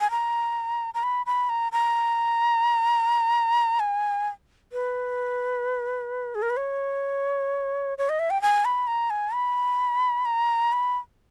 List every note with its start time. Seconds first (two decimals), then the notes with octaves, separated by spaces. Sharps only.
0.01 G#5
0.11 A#5
0.94 A#5
1.03 B5
1.26 B5
1.49 A#5
1.72 A#5
3.80 G#5
4.72 B4
6.35 G#4
6.42 A#4
6.50 B4
6.57 C#5
7.98 C#5
8.09 D#5
8.19 E5
8.30 G5
8.42 G#5
8.65 B5
8.87 A#5
9.10 G#5
9.34 B5
10.25 A#5
10.73 B5